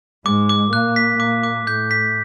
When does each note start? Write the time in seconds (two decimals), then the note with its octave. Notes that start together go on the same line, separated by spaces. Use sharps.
0.25 G#2 G#3 D6
0.49 D6
0.72 A#2 A#3 F#6
0.96 B6
1.19 A#2 A#3 D6
1.43 D6
1.67 A2 A3 G6
1.91 B6